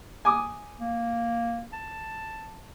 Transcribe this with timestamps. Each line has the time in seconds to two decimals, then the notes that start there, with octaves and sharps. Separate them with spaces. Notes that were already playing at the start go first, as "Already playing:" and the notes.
0.25 G#5 D6 D#6
0.80 A#3
1.73 A5